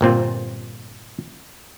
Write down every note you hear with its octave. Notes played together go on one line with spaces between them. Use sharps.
G1 A#2 C4 F4